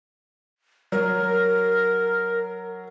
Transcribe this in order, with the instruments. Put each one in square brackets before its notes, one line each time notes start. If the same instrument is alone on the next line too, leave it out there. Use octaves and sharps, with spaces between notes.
[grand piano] F#3 [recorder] A#4